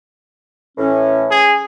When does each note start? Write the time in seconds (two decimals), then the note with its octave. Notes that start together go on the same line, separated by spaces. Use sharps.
0.78 A2 E3 C#4
1.31 G#4